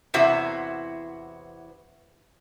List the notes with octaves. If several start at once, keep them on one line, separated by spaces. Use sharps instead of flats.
E2 C3 B3 E4 F#4 C5